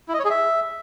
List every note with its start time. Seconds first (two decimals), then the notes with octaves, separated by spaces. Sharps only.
0.08 E4
0.14 D#5
0.19 C#5
0.25 G#4
0.30 E5